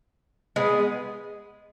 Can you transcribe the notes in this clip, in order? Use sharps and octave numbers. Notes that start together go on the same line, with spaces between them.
G#3 B3